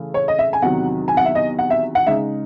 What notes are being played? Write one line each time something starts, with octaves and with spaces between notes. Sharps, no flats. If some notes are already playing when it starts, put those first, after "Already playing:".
Already playing: C#3 E3 A3
C#5
D#5
E5
G#5
E2 C3 D#3 F#3 F#5
G#5
F#5
E5
D#5
F#5
E5
F#5
C#3 G#3 D#4 E5